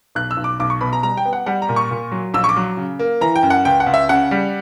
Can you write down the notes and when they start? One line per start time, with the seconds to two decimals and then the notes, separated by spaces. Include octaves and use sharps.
0.15 B1 F#6
0.31 E6
0.37 B1
0.44 D6
0.60 B1 D6
0.70 C#6
0.81 B2 B5
0.93 A#5
1.03 G3 A#5
1.17 G5
1.25 B3
1.33 F#5
1.46 G3 F#5
1.62 A#5
1.69 A#2
1.76 C#6
1.91 A#2
2.12 F#3
2.34 A#1 E6
2.44 C#6
2.49 D6
2.56 F#3
2.77 C#3
2.99 A#3
3.21 E3 A#5
3.36 G5
3.43 F#2
3.50 F#5
3.65 C#2 G5
3.80 F#5
3.86 C#2
3.94 E5
4.09 C#3 F#5
4.31 G3